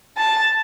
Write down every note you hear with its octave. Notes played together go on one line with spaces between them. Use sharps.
A5